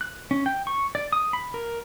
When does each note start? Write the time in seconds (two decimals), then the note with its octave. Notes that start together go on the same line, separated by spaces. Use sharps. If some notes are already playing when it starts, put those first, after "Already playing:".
0.01 F#6
0.31 C#4
0.46 G5
0.67 C#6
0.95 D5
1.12 D#6
1.33 B5
1.54 A#4